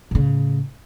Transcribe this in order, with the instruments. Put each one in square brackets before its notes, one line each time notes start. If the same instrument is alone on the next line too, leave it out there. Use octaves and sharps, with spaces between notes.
[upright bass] A2 C#3